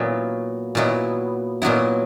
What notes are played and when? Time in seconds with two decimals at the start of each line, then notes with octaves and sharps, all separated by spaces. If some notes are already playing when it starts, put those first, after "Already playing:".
Already playing: A#2 F#3 B3 E4
0.75 A#2 F#3 B3 E4
1.62 A#2 F#3 B3 E4